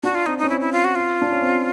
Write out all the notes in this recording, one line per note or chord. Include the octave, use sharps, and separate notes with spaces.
D4 F#4
F4
C4 D#4
C#4 D#4
C4 E4
E4
F4
F#4
F4
D4
C#4
C4